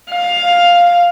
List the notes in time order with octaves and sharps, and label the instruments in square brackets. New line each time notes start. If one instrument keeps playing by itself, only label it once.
[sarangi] F5